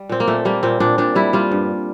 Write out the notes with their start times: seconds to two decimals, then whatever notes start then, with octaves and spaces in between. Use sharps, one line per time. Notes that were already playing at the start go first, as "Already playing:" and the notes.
Already playing: G3
0.09 A#2 C4
0.20 A#3
0.28 A#2 A3
0.45 G3 A#3
0.63 A#2 C4
0.80 A#2 D4
0.98 A#2 D4
1.15 G3 E4
1.33 G3 F4
1.51 G2